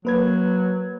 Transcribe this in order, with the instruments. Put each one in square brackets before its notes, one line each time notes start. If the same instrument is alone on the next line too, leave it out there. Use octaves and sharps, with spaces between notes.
[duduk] F#3 [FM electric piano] A#3 B4 G#6